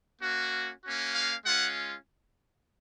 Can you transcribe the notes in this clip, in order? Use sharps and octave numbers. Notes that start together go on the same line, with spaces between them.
A#3 C#4 F#4
A#3 C#4 F#4
F5
G#3 C#4 F4 F#5